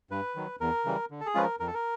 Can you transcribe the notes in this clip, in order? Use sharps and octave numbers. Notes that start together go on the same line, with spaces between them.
G2 B4
D#3 F#3
E2 A#4
C#3 E3 G3
D3
A4
G#4
F3 G#3 C#4 F4 B4
A#4
F2 A#4
A4
A#4